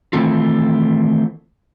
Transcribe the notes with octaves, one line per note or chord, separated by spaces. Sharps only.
D#3 E3 A3 C4 F4